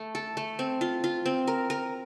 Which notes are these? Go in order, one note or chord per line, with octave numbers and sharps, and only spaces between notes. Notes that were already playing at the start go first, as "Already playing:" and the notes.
Already playing: A3
A4
A3
C4
F4
F4
C4
A#4
A#4